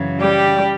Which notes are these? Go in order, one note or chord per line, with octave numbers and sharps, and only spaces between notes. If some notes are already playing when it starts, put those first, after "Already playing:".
Already playing: F#2 C#3 E3
G3 G4